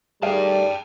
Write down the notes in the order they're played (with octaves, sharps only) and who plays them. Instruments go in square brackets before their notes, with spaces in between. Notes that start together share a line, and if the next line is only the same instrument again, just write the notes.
[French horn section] D#3 A3 D5 [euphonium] G3 [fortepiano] G#4 F5 [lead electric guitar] G5 A5